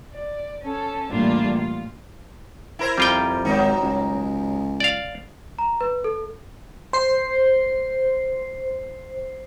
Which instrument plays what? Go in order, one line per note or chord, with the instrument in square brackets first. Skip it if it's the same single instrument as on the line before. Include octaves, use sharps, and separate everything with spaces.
[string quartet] D5
C#4 A4
A2 E3 G3 A#3 D4 F4
F4
[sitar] E4 A#4 C5
[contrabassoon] F2 [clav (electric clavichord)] G3 F4 G5
[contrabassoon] G#1 [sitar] F#3 D#4
[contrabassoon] C#2
[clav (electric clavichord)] D5 F5
[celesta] A#5
B4
A4
[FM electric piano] C5 C7